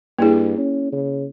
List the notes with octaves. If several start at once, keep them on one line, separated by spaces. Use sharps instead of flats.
G2 A#3 E4 G#4
C#4
C#3